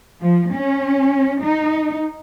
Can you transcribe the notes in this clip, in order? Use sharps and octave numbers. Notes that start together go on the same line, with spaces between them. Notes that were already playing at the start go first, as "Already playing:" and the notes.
F3
C#4
D#4